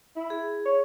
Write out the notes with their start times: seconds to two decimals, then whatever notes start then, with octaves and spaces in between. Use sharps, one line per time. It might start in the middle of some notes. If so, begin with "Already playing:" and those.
0.16 E4
0.30 G#4
0.66 C#5